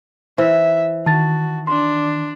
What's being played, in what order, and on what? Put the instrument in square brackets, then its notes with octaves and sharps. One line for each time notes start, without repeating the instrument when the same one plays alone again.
[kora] E3 [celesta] C5 [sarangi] E5
[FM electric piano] D#3 [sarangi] F#4 [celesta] A5 A6
[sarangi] D4 [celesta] C6